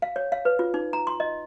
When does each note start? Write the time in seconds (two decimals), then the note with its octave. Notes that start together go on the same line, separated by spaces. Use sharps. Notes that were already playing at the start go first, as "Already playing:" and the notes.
0.02 F5
0.16 C#5
0.32 F5
0.45 B4
0.59 F4
0.74 D#4
0.93 A#5
1.07 C6
1.20 D#5